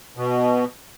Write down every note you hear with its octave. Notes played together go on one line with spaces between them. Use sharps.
B2